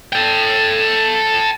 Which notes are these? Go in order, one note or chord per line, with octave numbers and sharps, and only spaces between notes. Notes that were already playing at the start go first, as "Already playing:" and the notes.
A4 G5